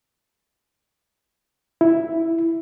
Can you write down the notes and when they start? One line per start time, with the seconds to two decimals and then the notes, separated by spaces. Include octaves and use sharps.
1.81 E4